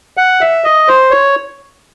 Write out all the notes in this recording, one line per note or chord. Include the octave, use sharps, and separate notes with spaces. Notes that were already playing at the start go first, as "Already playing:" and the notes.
F#5
E5
D#5
C5
C#5